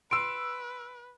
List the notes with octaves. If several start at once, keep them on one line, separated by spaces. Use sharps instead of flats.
B4 C6 E6 D7